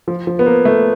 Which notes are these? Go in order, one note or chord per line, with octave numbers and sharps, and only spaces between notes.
F3
F3
B3
A#3
A3